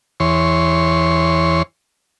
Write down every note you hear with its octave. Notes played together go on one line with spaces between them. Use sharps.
E2 C#5 C6